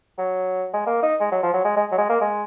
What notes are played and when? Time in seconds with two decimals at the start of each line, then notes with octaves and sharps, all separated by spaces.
0.18 F#3
0.73 G#3
0.86 A#3
1.03 D#4
1.20 G#3
1.31 F#3
1.43 F3
1.53 F#3
1.64 G#3
1.76 G#3
1.92 F#3
1.98 G#3
2.09 A#3
2.21 G#3